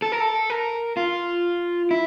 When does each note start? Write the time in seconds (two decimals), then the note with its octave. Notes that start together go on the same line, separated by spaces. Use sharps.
0.02 A4
0.12 A#4
0.20 A4
0.50 A#4
0.97 F4
1.91 E4